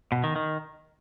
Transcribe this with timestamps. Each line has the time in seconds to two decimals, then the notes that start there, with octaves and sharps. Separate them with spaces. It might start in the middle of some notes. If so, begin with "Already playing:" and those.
0.12 B2
0.24 D#3
0.36 D#3